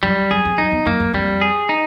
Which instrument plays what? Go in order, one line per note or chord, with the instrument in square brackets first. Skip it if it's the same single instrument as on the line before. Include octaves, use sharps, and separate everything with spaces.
[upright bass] F#2 [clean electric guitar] G3
[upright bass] F#2 [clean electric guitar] G#4
[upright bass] F2
[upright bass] F#2 [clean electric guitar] D#4
[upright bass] E2
[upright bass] F#2 [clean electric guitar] A#3
[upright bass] F#2
[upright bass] F2 [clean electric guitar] G3
[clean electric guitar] G#4
D#4